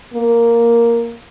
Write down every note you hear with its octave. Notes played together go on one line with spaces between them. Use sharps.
A#3